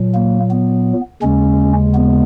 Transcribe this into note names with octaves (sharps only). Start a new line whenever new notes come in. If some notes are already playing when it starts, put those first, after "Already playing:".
Already playing: A#2 F#3
A#3
B3
D#2 C#3 G#3 C#4
B3